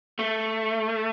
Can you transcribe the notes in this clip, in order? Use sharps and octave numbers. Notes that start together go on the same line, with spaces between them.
A3